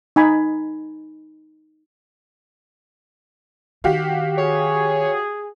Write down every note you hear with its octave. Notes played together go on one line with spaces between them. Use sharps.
D#4 G#5 B5
D#3 F#4 G4 F5
G#4 C#5